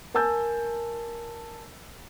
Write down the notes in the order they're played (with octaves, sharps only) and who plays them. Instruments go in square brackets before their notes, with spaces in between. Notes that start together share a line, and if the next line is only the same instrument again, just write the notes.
[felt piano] A#4 G#5 A5 E6 G6 A6